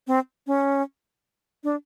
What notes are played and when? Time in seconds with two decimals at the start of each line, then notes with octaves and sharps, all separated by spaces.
0.07 C4
0.47 C#4
1.64 D4